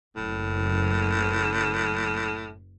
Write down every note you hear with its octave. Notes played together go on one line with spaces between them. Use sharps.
F#1 A2